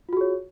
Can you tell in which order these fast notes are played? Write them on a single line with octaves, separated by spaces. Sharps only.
F4 F#4 G#4 C#5